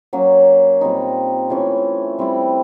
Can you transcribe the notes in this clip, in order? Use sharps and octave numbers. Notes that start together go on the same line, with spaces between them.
F#3 A#3 C#4
A#2 G3 C4 D#4
E3 A3 C#4 F4
G3 C4 E4